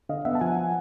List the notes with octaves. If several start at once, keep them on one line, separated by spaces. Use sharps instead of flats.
D3 D#5 F5
B3 E5 F#5
A5
F3 F#5 G#5
F3